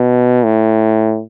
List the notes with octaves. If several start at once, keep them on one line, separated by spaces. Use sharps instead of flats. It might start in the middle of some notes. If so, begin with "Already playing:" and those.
Already playing: B2
A2